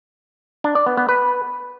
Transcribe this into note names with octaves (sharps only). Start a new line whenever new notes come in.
D4
D5
B3
B3
B4